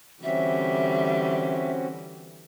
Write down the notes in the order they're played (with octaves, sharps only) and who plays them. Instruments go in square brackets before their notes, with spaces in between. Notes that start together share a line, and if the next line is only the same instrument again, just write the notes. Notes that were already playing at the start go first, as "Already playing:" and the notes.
[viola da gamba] D3 E3 G3 [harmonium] C4 C#4 F#4 [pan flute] E5